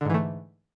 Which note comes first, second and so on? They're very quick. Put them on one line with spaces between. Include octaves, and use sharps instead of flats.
D3 G#2 E3 A3